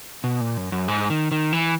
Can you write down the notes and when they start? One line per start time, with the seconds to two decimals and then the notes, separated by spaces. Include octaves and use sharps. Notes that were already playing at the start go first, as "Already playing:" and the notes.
0.24 B2
0.41 A#2
0.57 F#2
0.72 F#2
0.88 G#2
1.10 D#3
1.32 D#3
1.53 E3